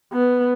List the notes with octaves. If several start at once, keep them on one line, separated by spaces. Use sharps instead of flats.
B3